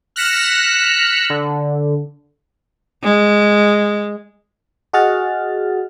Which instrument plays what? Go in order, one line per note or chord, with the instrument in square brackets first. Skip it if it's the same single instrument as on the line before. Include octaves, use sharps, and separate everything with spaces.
[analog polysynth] F6 F#6 A#6 B6 C#7 E7
D3
[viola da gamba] G#3
[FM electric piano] F#4 G#4 D#5 F#5 F6 A6